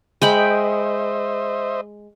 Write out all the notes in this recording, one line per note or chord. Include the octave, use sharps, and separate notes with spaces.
G#3 C5 D#5 E5 G5 B5